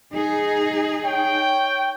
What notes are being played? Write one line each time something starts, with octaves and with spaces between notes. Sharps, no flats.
D#4 G#4
C#5 G5